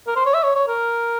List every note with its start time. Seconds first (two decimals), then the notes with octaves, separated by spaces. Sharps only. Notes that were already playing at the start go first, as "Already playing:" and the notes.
0.07 A#4
0.16 C5
0.26 C#5
0.34 E5
0.43 C#5
0.56 C#5
0.68 A#4